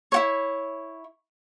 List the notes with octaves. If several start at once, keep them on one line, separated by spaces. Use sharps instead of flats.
E4 F#4 C#5